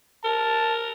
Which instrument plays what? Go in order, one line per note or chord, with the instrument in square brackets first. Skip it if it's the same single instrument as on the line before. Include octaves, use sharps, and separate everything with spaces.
[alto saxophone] A#4 [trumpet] A5